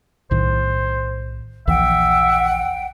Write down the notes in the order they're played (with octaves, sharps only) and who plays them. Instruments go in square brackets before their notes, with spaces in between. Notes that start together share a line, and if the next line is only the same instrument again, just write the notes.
[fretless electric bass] B1 A2 D#3 [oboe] C5
[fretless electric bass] A#1 D#2 E3 [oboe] E5 [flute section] F#5 G5